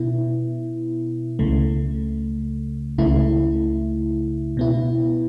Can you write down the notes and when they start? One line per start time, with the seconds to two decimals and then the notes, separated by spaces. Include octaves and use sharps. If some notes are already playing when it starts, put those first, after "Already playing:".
Already playing: B2 B3 E4
1.39 C#2 C#3 A3
2.98 C#2 C#3 A3 E4
4.57 B2 B3 E4